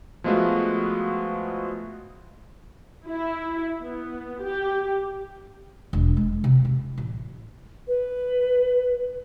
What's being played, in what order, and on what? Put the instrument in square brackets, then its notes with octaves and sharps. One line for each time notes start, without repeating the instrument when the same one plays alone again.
[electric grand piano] F3 G#3 A3 B3 F4 F#4
[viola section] E4
B3
G4
[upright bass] E1
G#3
C3
E4
A1
[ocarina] B4